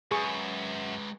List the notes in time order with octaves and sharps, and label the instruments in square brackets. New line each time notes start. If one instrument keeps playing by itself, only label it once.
[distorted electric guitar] F#2 [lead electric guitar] G#3 B4 [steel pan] G#4 C#6